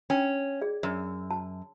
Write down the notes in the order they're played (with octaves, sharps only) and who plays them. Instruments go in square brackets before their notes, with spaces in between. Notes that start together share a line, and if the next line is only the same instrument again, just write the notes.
[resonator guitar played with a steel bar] C#4 [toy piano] G5
[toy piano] G#4 D5
[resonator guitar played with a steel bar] F#2 [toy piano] D5
[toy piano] A5